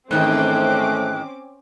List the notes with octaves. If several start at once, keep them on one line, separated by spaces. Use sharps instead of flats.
G#2 D#3 E3 A3 C4 C#4 D6 F#6